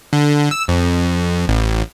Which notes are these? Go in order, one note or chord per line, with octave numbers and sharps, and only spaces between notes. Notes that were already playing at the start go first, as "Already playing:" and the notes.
D3
E6
F2
A1